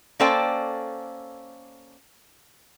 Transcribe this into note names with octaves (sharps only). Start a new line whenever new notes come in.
A#3 C#4 A4 C5 D5 G5